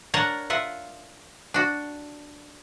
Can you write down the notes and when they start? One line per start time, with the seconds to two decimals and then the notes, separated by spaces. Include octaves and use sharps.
0.14 D4 A#4 C#5 F#5 A5 A#5
0.50 F4 E5 F#5
1.54 D4 F#4